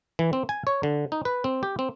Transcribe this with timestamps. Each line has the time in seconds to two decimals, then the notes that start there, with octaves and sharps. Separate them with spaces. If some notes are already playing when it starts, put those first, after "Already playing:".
0.19 E3
0.33 C4
0.49 G#5
0.67 C#5
0.83 D3
1.12 D#4
1.25 B4
1.44 C4
1.63 G4
1.79 C4